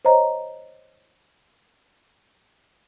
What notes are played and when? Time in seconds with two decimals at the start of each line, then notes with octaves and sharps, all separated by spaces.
0.05 C5 C#5 D#5 A#5